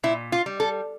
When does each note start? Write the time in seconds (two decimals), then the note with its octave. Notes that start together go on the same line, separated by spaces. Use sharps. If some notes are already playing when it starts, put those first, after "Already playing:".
0.03 A#2 E4
0.32 F4
0.46 G3
0.60 A4